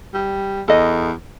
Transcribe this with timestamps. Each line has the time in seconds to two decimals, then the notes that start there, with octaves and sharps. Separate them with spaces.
0.14 G3
0.68 E2 A4 D#5